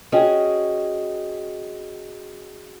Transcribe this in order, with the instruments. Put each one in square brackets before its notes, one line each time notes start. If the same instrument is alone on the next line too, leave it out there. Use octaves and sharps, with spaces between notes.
[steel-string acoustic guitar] C#4 F#4 G#4 D#5 G5